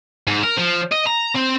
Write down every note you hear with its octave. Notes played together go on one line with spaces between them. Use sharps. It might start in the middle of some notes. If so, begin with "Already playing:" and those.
G#2
A#4
F3
D#5
A#5
C4